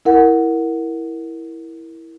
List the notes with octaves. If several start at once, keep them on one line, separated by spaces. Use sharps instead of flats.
E4 A#4 F#5